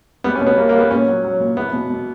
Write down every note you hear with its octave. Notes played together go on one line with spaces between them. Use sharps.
G3 B3
C#4
B2
B3
G3 A#3
A#3
G3
B3
A#2 C#4
F#3
F#3
A#2
E2 B3
B2
B2